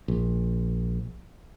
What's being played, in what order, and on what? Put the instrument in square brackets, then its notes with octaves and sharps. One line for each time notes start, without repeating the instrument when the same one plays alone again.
[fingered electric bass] A#1